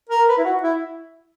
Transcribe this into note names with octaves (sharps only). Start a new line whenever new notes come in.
A#4
B4
E4
F#4
E4